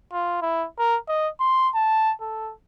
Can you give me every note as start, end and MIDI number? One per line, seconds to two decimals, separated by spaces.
0.12 0.38 65
0.42 0.66 64
0.78 0.97 70
1.09 1.28 75
1.40 1.69 84
1.74 2.13 81
2.21 2.52 69